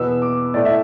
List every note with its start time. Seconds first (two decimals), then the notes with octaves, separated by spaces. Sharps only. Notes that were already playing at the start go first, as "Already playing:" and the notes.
Already playing: E2 B2 B3 E6
0.22 D6
0.54 A2 A3 D5
0.65 E5